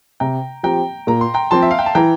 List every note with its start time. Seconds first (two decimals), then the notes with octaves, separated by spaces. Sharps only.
0.20 C3 G5 A#5
0.63 F3 C4 G4 G5 A#5
1.07 A#2 A#5
1.21 C6
1.34 G5 A#5
1.51 F3 C4 A5 C6
1.62 E5
1.71 F5
1.79 G5
1.86 A5
1.95 E3 G5 A#5